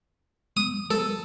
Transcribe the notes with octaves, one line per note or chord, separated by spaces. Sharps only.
D#6
A4